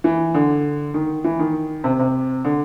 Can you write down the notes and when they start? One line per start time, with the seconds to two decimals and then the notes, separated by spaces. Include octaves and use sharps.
0.04 E3
0.34 D3
0.94 D#3
1.24 E3
1.39 D#3
1.84 C3
1.99 C3
2.45 D3